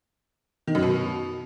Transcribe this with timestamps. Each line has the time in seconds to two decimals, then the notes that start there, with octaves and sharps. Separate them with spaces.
0.67 D#3
0.75 F#2
0.82 B2